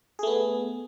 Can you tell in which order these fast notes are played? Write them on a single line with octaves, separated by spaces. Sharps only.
G#4 A3 B3